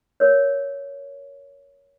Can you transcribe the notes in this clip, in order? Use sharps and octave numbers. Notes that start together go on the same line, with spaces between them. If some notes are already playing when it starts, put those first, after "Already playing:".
A#4 C#5